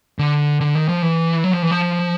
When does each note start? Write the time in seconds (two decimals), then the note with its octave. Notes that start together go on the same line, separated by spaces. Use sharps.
0.19 D3
0.61 D3
0.75 D#3
0.88 F3
1.02 E3
1.44 F#3
1.53 F3
1.62 E3
1.71 F3